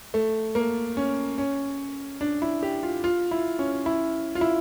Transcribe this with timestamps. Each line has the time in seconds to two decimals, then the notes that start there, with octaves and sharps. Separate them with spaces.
0.14 A3
0.55 A#3
0.97 C#4
1.38 C#4
2.21 D4
2.42 E4
2.62 G4
2.83 F4
3.04 F4
3.31 E4
3.59 C#4
3.86 E4
4.35 F4
4.41 E4